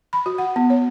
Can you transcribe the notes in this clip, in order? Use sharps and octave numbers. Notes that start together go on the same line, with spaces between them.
B5
F#4
F#5
B3
C#5